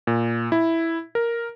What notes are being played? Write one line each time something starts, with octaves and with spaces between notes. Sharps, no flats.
A#2
E4
A#4